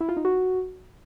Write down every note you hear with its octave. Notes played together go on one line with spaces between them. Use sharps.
E4
F4
D#4
F#4